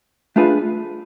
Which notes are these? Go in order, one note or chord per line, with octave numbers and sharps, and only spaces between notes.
A3 D4 F4 G#4 B4